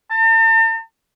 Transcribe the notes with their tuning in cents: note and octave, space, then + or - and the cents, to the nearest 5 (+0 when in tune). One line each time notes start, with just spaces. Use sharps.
A5 +45